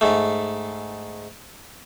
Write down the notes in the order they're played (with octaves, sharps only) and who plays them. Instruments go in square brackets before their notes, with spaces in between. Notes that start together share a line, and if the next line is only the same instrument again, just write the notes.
[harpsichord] G#2 A3